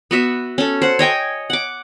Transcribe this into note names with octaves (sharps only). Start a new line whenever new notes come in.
B3 F#4 E5
C#4 A4
C5 F#5
C#5 D#5 G5 G#5
F#5 D6